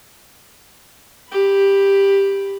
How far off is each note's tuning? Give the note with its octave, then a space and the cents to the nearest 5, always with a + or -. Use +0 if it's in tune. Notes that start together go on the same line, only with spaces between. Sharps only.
G4 +10 B5 +0